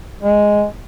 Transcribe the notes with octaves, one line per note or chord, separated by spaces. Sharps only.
G#3